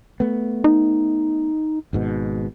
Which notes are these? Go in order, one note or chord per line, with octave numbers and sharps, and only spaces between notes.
A3 B3
D#4
G#1 G#2 B2